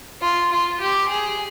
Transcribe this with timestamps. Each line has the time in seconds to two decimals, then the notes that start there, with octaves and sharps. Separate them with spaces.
0.22 F4
0.52 F4
0.80 G4
1.09 G#4